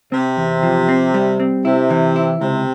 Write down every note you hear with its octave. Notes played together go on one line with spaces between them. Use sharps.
C3 C4
E2
F3
C4
G3
C4
C3 E4
E3
E4
C#2 C3